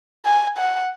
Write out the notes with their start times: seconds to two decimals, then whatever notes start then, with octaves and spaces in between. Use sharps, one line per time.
0.25 G#5
0.58 F#5